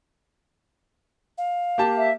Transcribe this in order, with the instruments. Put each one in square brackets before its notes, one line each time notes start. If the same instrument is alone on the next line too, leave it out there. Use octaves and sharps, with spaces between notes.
[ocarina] F5
[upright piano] A#3 G4 A5
[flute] E5